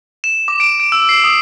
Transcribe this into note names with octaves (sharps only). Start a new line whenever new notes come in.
E7
D6
D7
D7
E6
C7
D#6